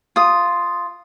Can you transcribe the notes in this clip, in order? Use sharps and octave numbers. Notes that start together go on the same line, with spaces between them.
F4 D#6